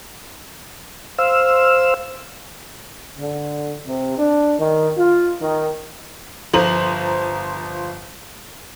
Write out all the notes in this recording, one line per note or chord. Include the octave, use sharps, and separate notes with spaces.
C5 F5 E6
D3
C3
D4
D#3
F4
D#3
G1 F3 C5 A#5 F#7